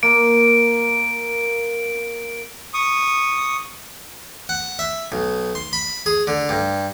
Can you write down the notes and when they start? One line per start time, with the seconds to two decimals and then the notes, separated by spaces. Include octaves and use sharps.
0.03 A#3 D7
2.74 C#6 D#6
4.49 F#5
4.79 E5
5.12 B1
5.55 C6
5.73 B5
6.06 G#4
6.27 D3
6.49 G2